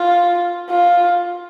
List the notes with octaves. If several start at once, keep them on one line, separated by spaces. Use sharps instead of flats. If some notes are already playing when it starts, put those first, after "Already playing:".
Already playing: F4
F4